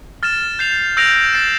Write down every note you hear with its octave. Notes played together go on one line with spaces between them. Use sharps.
F6 A6 E7
G6 C7 F7
E6 G6 A#6 D7 F7
A6 C7 E7